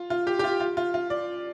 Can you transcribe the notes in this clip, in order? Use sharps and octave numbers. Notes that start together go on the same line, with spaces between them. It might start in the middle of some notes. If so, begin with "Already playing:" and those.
Already playing: F4
F4
G4
G4
F4
F4
F4
F4
D5